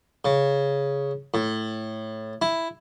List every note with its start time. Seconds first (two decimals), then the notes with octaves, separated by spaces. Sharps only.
0.25 C#3
1.34 A2
2.42 E4